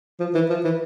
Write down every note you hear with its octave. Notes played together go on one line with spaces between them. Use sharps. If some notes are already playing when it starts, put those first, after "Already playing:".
F3
E3
F3
E3